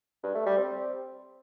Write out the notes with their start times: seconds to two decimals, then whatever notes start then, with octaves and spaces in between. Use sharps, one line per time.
0.23 G2
0.35 A3
0.46 G3
0.58 C4